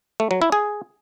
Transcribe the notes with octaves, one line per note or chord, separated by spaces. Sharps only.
A3
F#3
E4
G#4